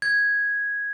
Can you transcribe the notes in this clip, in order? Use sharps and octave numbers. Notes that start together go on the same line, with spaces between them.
G#6